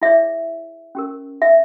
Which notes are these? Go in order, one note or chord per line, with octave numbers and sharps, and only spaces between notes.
E4 G#4 C#5 E5
C#4 G4 A#4
E5